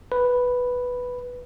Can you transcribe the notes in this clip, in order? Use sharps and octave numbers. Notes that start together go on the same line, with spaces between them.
B4